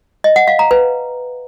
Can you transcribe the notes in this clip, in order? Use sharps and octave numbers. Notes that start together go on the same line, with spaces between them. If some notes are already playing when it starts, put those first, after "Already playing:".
D#5
F#5
F5
A#5
B4